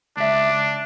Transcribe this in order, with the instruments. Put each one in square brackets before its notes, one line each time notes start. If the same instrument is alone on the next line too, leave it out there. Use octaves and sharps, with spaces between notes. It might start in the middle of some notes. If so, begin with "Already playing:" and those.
[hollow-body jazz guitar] C#2 E5 [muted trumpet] D4